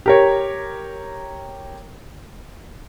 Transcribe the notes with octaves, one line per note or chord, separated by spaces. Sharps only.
G4 A#4 C#5